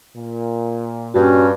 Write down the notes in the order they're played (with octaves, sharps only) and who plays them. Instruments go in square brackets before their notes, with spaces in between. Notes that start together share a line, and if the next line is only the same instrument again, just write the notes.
[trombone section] A#2
[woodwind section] G2 [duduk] C#4 [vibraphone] F#4